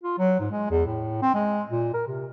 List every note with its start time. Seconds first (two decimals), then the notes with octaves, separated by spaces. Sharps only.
0.03 F4
0.18 F#3
0.40 G#2
0.51 G#3
0.71 E2
0.86 A2
1.22 C4
1.35 G#3
1.70 A#2
1.94 A#4
2.07 C3